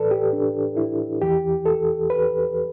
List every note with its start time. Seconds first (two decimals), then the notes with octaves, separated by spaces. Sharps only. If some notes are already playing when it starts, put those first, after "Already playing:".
Already playing: A2 E3 A4 B4 D5
0.11 G4
0.33 D4
0.77 E4
1.22 E2 E3 G4
1.66 A4
2.10 B4